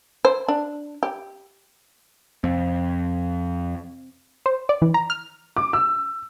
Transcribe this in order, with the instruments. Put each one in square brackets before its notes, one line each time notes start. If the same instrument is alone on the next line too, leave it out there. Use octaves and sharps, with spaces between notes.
[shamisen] C5
D4
G4
[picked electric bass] F2 [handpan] C4
[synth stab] C5
D5
E3
A#5
F6
[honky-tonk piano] D6
E6